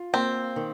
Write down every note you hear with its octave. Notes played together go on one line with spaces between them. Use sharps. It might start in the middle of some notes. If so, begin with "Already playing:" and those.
Already playing: F4
A#3 C4
D#3